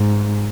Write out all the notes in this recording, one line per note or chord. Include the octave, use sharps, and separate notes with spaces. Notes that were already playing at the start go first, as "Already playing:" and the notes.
Already playing: G#2